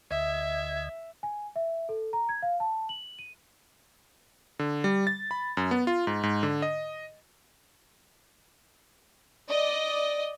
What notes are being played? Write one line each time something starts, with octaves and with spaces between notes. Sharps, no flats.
D2 D#5 E5 G#6
G#5
E5
A4
A#5
G#6
F5
A5
F#7
D#7
D3
G3
A6
B5
F#2
B3
F4
G#2
G#2
D3
D#5
D5 D#5